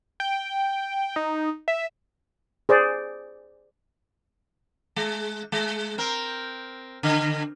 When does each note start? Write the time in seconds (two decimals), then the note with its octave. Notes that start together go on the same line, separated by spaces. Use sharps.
0.20 G5
1.16 D#4
1.68 E5
2.69 G#4 C5 D5
4.96 G#3
5.52 G#3
5.98 C4 A#4
7.03 D3